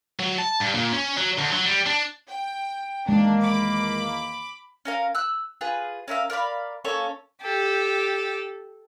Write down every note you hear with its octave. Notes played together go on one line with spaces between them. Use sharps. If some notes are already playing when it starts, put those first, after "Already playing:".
F#3
A5
G2
A#2
C#4
F#3
D2
F#3
G3
D4
G5
E2 D#3 G#3 A#3 D4
B5 D6
C#4 A#4 F5
E6 F#6
F4 G#4 B4 F#6
C#4 A#4 E5 F5
A#4 D5 F5 B5
A#3 C#4 A4 C#5
G4 A4